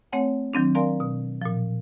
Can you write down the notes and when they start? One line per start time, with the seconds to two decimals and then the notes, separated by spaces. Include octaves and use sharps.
0.12 A3 C4 C#5 F#5 G#5
0.53 D#3 F#3 C4 D4
0.75 A#4 D5 F5 G#5 A#5 C6
1.00 B2
1.42 A#2 F3